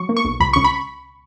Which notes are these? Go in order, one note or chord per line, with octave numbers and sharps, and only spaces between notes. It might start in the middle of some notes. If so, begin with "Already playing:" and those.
Already playing: F#3 C#6
A#3
C#6
B1
C#2 B5
C#2 C#6
B5